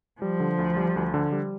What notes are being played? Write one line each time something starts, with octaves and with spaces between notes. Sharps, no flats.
F3 G3
D3
D2
G3
D2
D3
G3